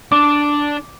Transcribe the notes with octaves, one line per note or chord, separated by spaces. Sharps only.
D4 D6